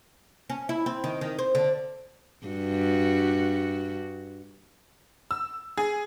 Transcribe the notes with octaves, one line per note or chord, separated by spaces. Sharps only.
C#4
E4
C4
D#3
D#3
C5
D3
G2 F#4
E6
G#4